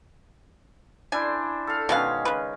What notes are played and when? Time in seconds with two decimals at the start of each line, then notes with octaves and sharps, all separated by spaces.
1.12 D4 E4 C5 G#5
1.67 A4 F5
1.89 B2 D#3 G#3 C#4 B4 F5
2.25 C#3 B4